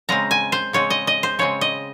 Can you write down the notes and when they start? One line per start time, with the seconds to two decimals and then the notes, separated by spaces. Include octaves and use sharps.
0.09 C#3 G#3 C4 A#5
0.31 G#5
0.52 C5
0.73 C#3 G#3 C4 C#5
0.90 D#5
1.07 D#5
1.23 C5
1.39 C#3 G#3 C4 C#5
1.61 D#5